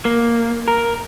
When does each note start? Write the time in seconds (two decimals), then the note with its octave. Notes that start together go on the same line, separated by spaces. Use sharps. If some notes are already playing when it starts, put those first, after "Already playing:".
0.05 A#3
0.68 A#4